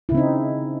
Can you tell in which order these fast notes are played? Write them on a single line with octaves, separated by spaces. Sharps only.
E4 C#3 C4 D#4